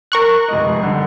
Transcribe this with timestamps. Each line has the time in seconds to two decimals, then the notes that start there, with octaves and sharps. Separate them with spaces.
0.12 A#4 C#6 F#6
0.48 F1 G#2 D#5
0.80 G2 D3